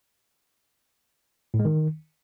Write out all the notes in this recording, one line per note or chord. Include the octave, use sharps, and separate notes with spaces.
A2
G#3
D#3